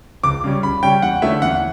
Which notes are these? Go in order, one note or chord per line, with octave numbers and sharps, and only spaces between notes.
C#2 D6
C#3 G3 C#4
C#2 B5
C#3 G3 C#4 G5
E2 F#5
D3 A3 C#4 E5
E2 F#5